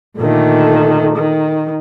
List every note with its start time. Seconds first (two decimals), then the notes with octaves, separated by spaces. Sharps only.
0.18 A#2 D3 D#3 A3
1.16 D#3